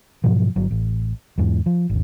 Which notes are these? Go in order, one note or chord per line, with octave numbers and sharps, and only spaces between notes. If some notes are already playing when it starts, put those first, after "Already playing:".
G#2 B2 F3 F#3
G1 F#3
A1
E2 G#2 E3
F3
G#1 D#2